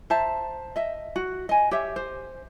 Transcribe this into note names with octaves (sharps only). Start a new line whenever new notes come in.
C5 E5 A5 A#5
D#5 E5
F#4
D#5 G#5
G4 C#5 E5
C5